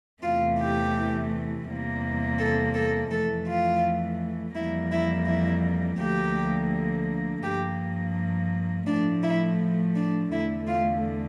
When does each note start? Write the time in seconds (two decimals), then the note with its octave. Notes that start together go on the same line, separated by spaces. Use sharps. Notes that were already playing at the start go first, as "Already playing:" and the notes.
0.22 E2 C3 E3 A3 F4
0.59 G4
1.67 E2 C3 G3 A#3
2.39 A4
2.75 A4
3.10 F2 E3 A3 A4
3.47 F4
4.55 F2 E3 G3 A#3 E4
4.91 E4
5.27 E4
5.99 D2 D3 F3 A#3 G4
7.43 G2 F3 A#3 G4
8.86 A2 F3 A3 D4
9.23 E4
9.95 D4
10.31 E2 D3 A3 E4
10.67 F4